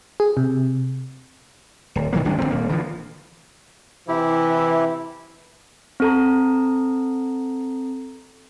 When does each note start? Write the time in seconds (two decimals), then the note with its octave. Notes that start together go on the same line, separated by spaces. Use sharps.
0.20 G#4
0.37 C3
1.95 D1
2.13 B1 D#3 F#3 A#3
2.25 G1 C2 G#3 D4
2.38 A#1 A2 D3 C4
2.51 D#1 A#3
2.69 D3 E3 F3
4.08 C3 E3 E4 G4
6.00 C4 A4 A#5